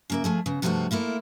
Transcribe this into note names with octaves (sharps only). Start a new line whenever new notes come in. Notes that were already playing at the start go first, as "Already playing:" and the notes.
C#3 A#3 E5
F3 A3 G#4
C#3 B3
G2 C3 F3 A3 B3 F#4
A3 A#3 E4 F4